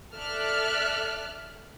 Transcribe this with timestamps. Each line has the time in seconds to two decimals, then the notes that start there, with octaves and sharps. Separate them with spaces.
0.16 A4 D5 E5 F6 F#6